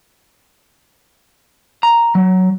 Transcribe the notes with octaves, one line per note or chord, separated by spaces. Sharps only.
A#5
F#3